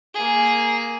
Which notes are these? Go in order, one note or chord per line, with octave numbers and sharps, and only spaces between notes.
A#3 G#4